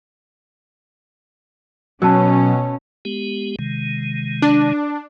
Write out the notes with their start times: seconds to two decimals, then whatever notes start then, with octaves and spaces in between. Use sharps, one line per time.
2.02 B2 F#3 C#4 A5 E6
3.05 G#3 B3 G4
3.59 C3 D#3 G#3
4.42 D4